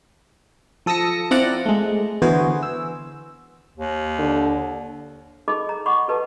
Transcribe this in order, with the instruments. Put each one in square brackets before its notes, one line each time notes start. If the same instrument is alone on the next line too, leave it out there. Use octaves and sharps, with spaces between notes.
[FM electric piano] F3 A4 D#6 E6 A#6 C#7
C4 E4 F4 D5 F#5 A#5
G#3 A3
D3 E3 B3 F#4 G#4 C5
E6
[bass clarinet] D#2
[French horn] D3
[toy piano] D#4 G#4 A4 D#5 B5 D6
A#5
D#5 F#5 B5 C#6 D6
G4 A4 B4 D#5 A5